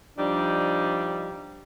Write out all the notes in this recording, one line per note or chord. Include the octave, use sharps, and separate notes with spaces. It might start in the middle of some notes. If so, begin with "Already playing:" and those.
F3 G3 D4 D#4